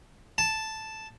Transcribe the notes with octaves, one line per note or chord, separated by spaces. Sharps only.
A5